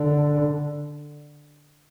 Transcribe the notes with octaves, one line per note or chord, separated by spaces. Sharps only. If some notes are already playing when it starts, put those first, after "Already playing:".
Already playing: D3